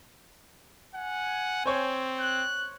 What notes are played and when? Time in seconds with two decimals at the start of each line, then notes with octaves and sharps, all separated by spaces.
0.94 F#5 G#5
1.66 C4 C5 C#5
2.20 F#6